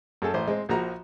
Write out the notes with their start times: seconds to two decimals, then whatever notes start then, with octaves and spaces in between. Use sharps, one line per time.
0.22 F#2 G#4 A4 A5
0.34 A1 C5
0.47 G#3 C4
0.69 A#1 F3 F#4 A#5